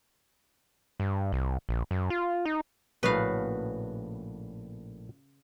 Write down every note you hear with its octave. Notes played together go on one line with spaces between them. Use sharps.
G2
C2
A#1
F#2
F4
D#4
A#1 A2 C#3 B3 F#4 B4 F5